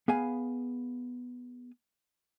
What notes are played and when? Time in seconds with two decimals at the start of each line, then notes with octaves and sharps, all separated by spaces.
0.08 B3 G#4 F5 G#5